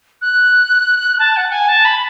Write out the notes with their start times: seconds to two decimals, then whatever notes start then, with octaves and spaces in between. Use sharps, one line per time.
0.22 F#6
1.19 A5
1.37 F#5
1.52 G#5
1.68 A5
1.85 B5